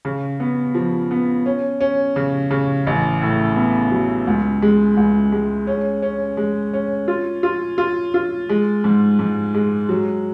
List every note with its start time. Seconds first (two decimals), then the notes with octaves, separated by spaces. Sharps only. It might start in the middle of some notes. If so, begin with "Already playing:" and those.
0.05 C#3
0.40 B3
0.75 F3
1.11 B3
1.46 C#4
1.81 C#4
2.16 C#3
2.51 C#3
2.87 A1
3.22 A2
3.56 B3
3.91 F#3
4.27 C#2
4.62 G#3
4.97 C#2
5.32 G#3
5.67 C#4
6.02 C#4
6.37 G#3
6.74 C#4
7.08 F4
7.43 F4
7.78 F4
8.14 F4
8.49 G#3
8.84 G#2
9.19 G#2
9.54 G#3
9.89 F#3